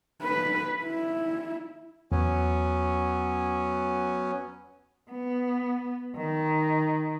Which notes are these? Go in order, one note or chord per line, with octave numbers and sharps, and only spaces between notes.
B4
E4
E2 F#3 B3 C#4
B3
D#3